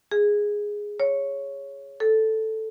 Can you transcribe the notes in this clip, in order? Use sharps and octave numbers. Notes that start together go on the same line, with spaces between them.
G#4
C#5
A4